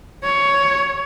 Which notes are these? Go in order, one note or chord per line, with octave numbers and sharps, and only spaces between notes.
C#5